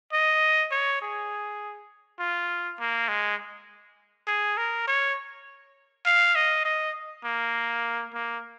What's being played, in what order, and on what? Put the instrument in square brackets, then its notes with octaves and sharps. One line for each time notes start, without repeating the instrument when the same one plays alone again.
[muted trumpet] D#5
C#5
G#4
F4
A#3
G#3
G#4
A#4
C#5
F5
D#5
D#5
A#3
A#3